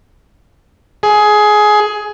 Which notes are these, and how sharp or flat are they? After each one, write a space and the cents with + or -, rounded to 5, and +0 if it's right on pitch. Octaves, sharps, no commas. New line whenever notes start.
G#4 +15